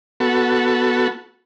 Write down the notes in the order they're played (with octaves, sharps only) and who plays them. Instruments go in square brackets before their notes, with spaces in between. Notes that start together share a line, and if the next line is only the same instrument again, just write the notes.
[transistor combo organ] B3 F#4 A4